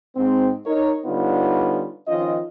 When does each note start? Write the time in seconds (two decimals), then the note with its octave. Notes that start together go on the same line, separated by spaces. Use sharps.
0.16 G#2 C4
0.66 D#4 A#4 C#5
1.05 D3 G3 B3 C#4 D#4 F4
2.08 D#3 F3 C#4 F4 D#5